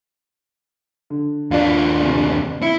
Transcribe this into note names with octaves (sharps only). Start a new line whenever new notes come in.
D3
D#2 D4 F4 D5
C3
E4 C#7 G7